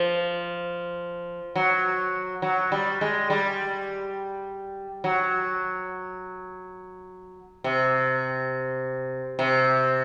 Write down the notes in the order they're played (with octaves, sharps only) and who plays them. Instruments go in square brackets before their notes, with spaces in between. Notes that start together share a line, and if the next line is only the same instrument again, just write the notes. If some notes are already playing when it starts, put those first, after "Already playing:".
Already playing: [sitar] F3
F#3
F#3
G3
G#3
G3
F#3
C3
C3